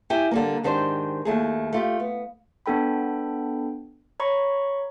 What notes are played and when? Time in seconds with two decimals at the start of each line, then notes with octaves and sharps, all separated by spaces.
0.10 E4 G4 G5 G#5
0.31 D3 G3 A#3
0.63 G#2 D#3 D4 G4 C5
1.25 D#2 A3 G#4
1.73 A3 F4 G4
2.00 B3
2.66 B3 D4 A4 G5 B5
4.20 C#5 A#5 B5 C#6